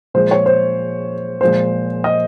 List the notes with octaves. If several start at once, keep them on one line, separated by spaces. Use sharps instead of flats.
A#2 F3 G#3 C5
C#5
C5
A#2 F3 G#3 C5
D#5